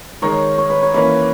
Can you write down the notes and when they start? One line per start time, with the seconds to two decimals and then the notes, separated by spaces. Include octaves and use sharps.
0.22 D#3 G#3 D#4 A#4 C#5
0.58 C#5
0.70 B4
0.82 C#5
0.94 E3 A#3 C#4 B4